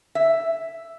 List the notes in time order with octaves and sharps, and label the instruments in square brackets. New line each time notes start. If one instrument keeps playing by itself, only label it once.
[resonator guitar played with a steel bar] E5